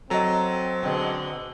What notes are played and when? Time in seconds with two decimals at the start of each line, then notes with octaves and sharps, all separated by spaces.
0.10 F#3 C4 A4 D#5 A#5
0.83 B2 D3 G#3